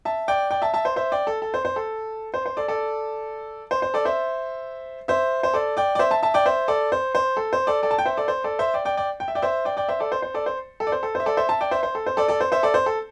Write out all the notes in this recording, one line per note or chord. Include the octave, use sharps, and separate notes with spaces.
E5 A5
D5 G5
D5 G5
E5 A5
E5 A5
C5
C5 E5
D5 G5
A4
A4
C5
C5
A4
C5
C5
A4 D5
A4 D5
C5
C5
A4 D5
C5 E5
C5 E5
C5
A4 D5
D5 G5
D5
C5 E5
E5 A5
E5 A5
D5 G5
C5 E5
A4 D5
C5
C5
A4
C5
A4 D5
A4 D5
A5
G5
C5 E5
A4 D5
C5
A4 D5
C5 E5
D5 G5
D5 G5
D5 G5
G5
E5
D5 G5
C5 E5
D5 G5
D5 G5
C5 E5
A4 D5
C5
C5
A4 D5
C5
A4
D5
C5
A4
C5 E5
A4 D5
C5 E5
E5 A5
D5 G5
C5 E5
C5
A4
C5
A4 D5
A4 D5
C5
C5 E5
A4 D5
C5
A4